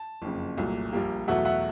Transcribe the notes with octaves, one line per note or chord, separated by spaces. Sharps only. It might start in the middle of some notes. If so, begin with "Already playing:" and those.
Already playing: A5
F#1 F2 C#3
C2 A#2 F#3 A3
A#1 A#2 G3 A#3
E2 B2 F#3 A3 E5 F#5
E5 F#5